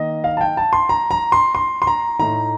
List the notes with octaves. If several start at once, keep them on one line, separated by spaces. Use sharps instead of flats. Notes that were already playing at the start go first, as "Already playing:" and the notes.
Already playing: D#3 A#3 D#4 D#5
F5
A5
G5
A5
C6
A#5
A#5
C6
C6
C6
A#5
A2 A3 D#4 A#5